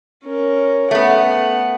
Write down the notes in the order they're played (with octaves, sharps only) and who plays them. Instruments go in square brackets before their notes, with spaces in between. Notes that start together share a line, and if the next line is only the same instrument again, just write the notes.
[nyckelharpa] C#4 A#4
[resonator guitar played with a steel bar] A3 B3 [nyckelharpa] F#5